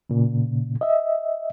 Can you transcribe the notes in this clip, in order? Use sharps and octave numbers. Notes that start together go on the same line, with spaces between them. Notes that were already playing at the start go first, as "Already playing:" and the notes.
A#2 C#3
D#5 E5